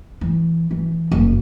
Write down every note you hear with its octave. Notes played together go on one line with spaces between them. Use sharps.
E3
E3
F#1